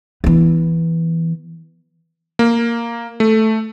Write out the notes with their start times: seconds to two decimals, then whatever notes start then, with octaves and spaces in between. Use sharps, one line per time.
0.24 E3 B3
2.39 A#3
3.20 A3